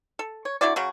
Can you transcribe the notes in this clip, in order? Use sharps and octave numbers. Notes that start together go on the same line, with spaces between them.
A4
C#5
D3 E4 F#4 D5
C#3 F#3 F#4